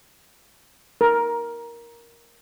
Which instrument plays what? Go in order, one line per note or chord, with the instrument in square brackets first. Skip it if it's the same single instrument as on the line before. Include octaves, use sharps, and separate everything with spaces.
[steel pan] A#4